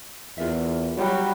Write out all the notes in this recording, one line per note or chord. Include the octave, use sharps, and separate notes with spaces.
E2 F4 A#4 E5
F#3 G3 F#4